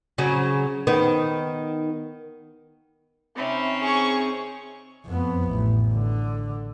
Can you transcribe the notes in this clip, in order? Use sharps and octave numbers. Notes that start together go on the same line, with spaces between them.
C#3 F#3
D#3 B3
C3 C4 C#4 D#4 B5 D6
G#4 C#6
F2 B3
A1
D3